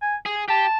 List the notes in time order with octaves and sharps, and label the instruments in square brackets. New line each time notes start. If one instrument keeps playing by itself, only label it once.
[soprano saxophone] G#5
[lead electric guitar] G#4
[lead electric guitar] G4 [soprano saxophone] A5